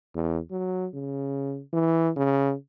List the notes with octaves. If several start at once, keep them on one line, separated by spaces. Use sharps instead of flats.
E2
F#3
C#3
E3
C#3